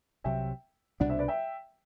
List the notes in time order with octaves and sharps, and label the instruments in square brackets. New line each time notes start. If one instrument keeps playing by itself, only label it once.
[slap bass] C2 C3 F#3 [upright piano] E5 G5
[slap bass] C2 B2 G3 D4 [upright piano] D5 F#5
[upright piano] C5 E5
B4 D5
E5 G5